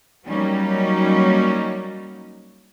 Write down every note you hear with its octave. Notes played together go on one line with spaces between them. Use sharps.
F#3 G3 A#3 C#4 D#4